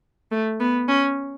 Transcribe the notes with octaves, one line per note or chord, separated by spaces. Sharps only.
A3
B3
C#4